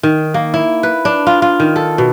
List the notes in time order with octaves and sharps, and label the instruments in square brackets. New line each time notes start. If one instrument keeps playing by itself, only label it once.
[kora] D#3
A#3
E4
B4
D4
F4
F4
D#3
A4
B2